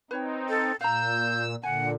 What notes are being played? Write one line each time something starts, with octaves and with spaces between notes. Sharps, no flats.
C4 D#4 B4 C#5 G5
A4
A#2 F5 A#5 E6 G6
A#2 D3 F#5 G#5